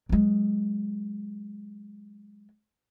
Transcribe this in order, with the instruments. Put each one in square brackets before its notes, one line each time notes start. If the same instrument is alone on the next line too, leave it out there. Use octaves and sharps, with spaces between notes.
[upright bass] F#3 G#3